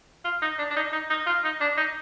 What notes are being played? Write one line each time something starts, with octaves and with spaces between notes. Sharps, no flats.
F4
D#4
D4
D4
D#4
D#4
D#4
F4
D#4
D4
D#4